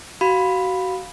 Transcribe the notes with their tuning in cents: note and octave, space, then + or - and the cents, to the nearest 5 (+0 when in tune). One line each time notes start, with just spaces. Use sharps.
F#4 +25 F5 +15 B5 +0